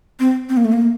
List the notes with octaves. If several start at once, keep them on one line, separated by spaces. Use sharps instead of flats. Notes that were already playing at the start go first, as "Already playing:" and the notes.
C4
C4
A#3
A3
A#3